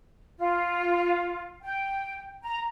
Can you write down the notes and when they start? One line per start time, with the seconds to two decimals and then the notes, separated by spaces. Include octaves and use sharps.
0.39 F4
1.62 G5
2.43 A#5